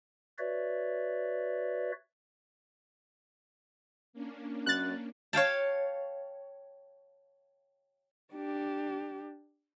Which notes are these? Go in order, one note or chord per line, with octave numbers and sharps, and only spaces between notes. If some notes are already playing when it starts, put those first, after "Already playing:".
F#4 B4 C#5 D5 E5
A#3 C#4 D4
F#2 F#6 A6
C#5 F5 G5 A5
D4 G4